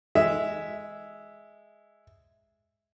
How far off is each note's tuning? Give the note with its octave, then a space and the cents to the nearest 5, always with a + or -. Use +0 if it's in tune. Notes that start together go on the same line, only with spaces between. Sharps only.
G#3 +0 E5 +0